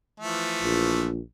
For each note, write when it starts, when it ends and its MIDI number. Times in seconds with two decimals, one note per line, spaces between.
0.20 1.09 52
0.20 1.09 53
0.20 1.09 57
0.61 1.19 34